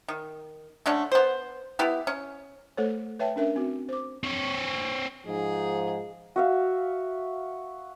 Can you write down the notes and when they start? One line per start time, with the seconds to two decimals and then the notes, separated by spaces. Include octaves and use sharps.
0.08 D#3
0.86 D3 A3 C#4 D4
1.12 B3 C5
1.79 B3 E4 G4
2.07 C#4
2.77 A3 A4 C5 C#5
3.19 B4 C#5 E5 G5 A5
3.36 C#4 D4 A#4 E5
3.56 C4 F#4
3.89 C5 D6
4.23 C4 C#5
5.25 G#2 F3 D#4 G#4
6.36 F#4 E5 F5